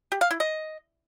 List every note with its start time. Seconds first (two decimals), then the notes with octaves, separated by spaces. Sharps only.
0.12 G4
0.21 F5
0.31 E4
0.40 D#5